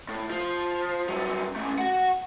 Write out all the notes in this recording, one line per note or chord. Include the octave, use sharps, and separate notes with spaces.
A2
F3
G2 F#3
A3 C#4
F#4 F#5